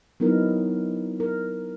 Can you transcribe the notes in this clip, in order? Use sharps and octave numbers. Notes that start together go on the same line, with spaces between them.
F#3 B3 C4 D#4 E4 A#4
A#4